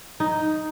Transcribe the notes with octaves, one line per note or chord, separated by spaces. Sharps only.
D#4